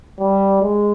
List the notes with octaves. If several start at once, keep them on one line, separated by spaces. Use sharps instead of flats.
G3
G#3